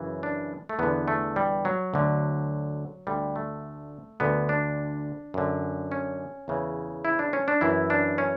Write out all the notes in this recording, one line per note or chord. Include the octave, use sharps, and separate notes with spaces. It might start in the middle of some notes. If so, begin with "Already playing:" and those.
Already playing: F#2 C#3 E3
D4
A3
E2 D3 B3
A3
G3
F#3
D2 D3
D2 D3 G3
A3
D2 D3 B3
D4
F#2 D3
C#4
E2 C#3 E3
E4
D4
C#4
D4
F#2 E3 E4
D4
C#4